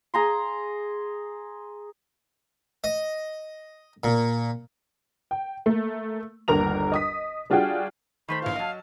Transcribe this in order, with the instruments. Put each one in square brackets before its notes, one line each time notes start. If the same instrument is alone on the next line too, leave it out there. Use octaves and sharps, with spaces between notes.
[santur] G#4 A#5 C6
[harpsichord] D#5
A#2
[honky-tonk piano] G5
A3 A#3
G1 D#2 D3 A#4 A#5 F7
D#5 D#6 B6
G3 D4 F4 F#4 G#4 G5
[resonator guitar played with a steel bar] D#3 A3 C5 [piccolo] B5
[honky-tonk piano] A#1 E3 [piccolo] F5
[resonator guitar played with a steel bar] F#3 D#5 [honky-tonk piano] A5 F6